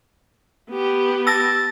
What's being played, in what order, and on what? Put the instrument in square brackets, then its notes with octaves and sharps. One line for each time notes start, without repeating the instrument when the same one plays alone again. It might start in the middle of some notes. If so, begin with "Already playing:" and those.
[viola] B3 G4
[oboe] A5 [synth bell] E6 A#6